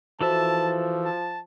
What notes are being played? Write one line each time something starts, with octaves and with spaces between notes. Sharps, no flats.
E3 F3 F#4 A4 C5 E5 A5
A5